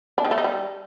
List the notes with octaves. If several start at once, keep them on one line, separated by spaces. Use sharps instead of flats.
D4
D#3
A3
D#4
G3